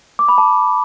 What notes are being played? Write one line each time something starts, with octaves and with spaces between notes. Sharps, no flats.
D6
B5
A5